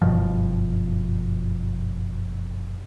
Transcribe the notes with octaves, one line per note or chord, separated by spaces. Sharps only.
F#1 G2 B2 F3